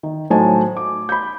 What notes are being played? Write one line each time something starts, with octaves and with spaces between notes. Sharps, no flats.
D#3
A2 F#3 D#4 C5 G#5 A5
D6
B5 G6